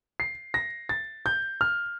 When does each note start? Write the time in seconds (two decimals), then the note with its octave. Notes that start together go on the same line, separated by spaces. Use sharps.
0.20 C7
0.54 A#6
0.89 A6
1.26 G6
1.61 F6